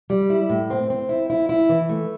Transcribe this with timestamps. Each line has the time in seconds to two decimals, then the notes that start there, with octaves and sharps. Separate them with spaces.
0.10 G3
0.30 E4
0.50 A2
0.70 C4
0.90 C4
1.09 E4
1.30 E4
1.49 E4
1.69 E3
1.89 A3